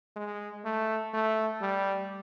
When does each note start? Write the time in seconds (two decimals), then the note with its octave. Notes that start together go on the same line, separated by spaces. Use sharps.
0.16 G#3
0.65 A3
1.14 A3
1.61 G3